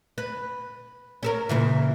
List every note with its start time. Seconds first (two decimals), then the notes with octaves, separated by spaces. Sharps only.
0.18 B4
1.23 C#4 A4 A#4
1.49 A#2 C#3 E3